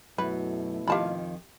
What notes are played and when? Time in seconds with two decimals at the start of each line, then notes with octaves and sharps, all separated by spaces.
0.18 F#2 B2 A3 E4 B4
0.88 F2 D#3 F4 G4 F5 A5 B5